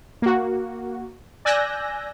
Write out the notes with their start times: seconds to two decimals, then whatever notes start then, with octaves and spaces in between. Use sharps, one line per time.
0.22 A#3 F#4
1.45 D5 G#5 E6 F#6 G6 A#6